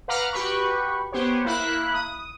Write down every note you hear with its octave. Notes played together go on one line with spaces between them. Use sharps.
B4 F5 F#5 A#5 D6 F6
F#4 G4 B4 B5 C#6
B3 G4 C5 C#5
A#3 E4 B5 F#6
D#6